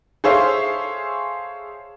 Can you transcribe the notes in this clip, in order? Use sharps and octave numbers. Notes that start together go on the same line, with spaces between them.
G#4 A4 C5 C#5 E5 F5